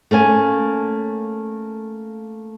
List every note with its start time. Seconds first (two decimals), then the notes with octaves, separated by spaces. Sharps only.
0.11 A3 A#3 C#4 G#5